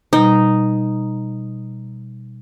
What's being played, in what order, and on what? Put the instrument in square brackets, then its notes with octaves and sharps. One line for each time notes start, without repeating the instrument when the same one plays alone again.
[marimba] B2 G3 [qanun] D#4